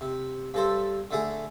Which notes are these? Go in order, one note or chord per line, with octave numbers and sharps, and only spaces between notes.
C3
G2 A4 C5
D3 A3 G#4